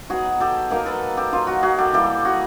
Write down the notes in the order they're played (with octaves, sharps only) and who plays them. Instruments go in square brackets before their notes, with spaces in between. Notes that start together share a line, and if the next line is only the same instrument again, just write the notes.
[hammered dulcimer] F#3 B3 D#4 F#4 G#4
G4 A4
F#3 A#3 D#4 G#4 A#4
A4 B4
G4 A4
F#3 A#3 D#4 F4
F#4
F#4 G#4
G4 A4
E3 G3 A#3 G4 A4
F#4 G#4